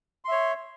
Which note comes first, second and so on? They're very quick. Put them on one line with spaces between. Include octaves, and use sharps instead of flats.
C6 E5 C#5